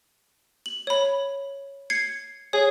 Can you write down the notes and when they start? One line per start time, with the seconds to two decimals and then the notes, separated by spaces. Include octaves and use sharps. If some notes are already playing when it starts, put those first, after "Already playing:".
0.66 F#7
0.87 C#5 B5
1.90 G#6 C7 C#7
2.53 G#4 C#5